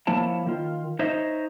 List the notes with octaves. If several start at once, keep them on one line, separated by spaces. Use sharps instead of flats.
F3 A#3 E4 C#5 A5
D#3 F4
D#4 C5 C#5 D#5 E5